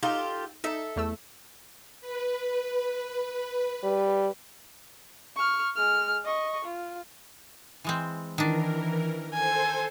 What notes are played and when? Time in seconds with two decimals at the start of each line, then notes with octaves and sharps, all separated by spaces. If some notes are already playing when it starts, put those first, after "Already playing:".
0.03 D#4 F4 G4 A4
0.64 D#4 A4 E5
0.96 E2 A3 E6
2.01 B4
3.83 G3
5.36 C#6 F6
5.75 G#3 F6
6.25 D#5 C#6
6.64 F4
7.84 E3 G#3 C4
8.38 D#3 E3 D4 A#4
9.34 A4 C5 G#5